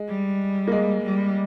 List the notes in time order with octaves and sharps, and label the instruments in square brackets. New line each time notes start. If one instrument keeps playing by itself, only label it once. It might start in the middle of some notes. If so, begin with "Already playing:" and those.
Already playing: [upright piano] G#3
[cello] G3
[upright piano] A#3
G#3
[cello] G3